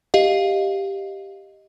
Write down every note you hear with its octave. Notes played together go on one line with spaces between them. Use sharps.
G4 D#5 F5